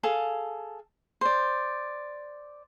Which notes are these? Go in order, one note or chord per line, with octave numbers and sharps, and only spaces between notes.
G#4 A4 F5
C5 D5